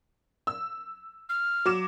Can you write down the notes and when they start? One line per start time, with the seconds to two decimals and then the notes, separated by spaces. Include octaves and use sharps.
0.47 E6
1.29 F6
1.65 F#3 D6 E7